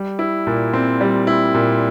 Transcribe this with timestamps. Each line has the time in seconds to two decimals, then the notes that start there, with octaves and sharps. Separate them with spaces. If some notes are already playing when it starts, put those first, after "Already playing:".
Already playing: G3
0.19 E4
0.47 A#2
0.73 C4
1.01 G3
1.27 E4
1.54 A#2